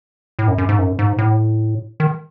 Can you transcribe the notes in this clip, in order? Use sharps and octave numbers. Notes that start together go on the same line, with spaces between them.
A2
F#2
F#2
G#2
F#2
G#2
A2
D#3